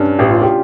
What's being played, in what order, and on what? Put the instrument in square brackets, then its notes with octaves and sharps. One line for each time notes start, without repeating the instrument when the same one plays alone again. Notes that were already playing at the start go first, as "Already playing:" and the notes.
Already playing: [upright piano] G2 [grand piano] C#4 D4
[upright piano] A1 [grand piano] G4
[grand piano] F4
G4